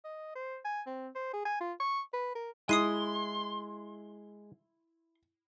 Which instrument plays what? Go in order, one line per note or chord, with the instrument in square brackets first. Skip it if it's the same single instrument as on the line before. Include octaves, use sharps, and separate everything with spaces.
[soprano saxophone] D#5
C5
G#5
C4
C5
G#4
G#5
F4
C#6
B4
A#4
[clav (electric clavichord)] G#3 [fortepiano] E4 [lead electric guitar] C6 [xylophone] D#6 C7 D#7